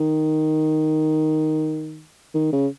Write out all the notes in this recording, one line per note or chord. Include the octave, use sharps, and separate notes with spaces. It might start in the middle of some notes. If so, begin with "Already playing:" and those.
Already playing: D#3
D#3
C#3